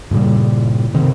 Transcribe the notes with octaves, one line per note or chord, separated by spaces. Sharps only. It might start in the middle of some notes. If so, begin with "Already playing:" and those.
G2 A#2 C#3 G3
C3 D#3